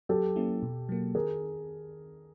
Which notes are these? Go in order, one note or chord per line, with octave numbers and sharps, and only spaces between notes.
F#3 G4 A4
A#3 C#4 E4
B2
F#3 A#3
D#3 G#4 A#4